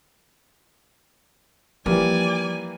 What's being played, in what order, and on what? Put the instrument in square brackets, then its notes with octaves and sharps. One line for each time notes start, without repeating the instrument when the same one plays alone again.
[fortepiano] E3 G3 A#3 [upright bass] F3 [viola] D5 G#5